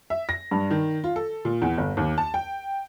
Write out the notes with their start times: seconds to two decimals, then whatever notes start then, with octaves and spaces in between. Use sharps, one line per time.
0.10 E5
0.29 A#6
0.51 G2
0.71 D#3
1.04 F4
1.16 A4
1.45 A#2
1.62 E2
1.77 G1
1.97 D#2
2.18 A5
2.34 G5